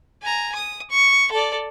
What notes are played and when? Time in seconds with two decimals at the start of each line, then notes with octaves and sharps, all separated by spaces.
0.22 G#5 A#5
0.55 D#6
0.91 C#6
1.31 A4 D5